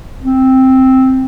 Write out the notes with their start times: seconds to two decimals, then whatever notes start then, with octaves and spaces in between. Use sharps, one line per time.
0.23 C4